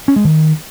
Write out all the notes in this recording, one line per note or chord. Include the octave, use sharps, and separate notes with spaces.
C#4
G#3
D#3